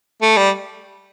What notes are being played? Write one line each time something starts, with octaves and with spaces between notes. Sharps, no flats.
A3
G3